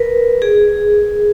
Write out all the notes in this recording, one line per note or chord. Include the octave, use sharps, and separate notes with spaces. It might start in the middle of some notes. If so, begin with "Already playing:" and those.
Already playing: A#4 B4
G#4